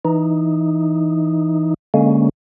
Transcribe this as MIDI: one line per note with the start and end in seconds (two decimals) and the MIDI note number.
0.05 1.74 52
0.05 1.74 63
1.94 2.29 50
1.94 2.29 56
1.94 2.29 58
1.94 2.29 61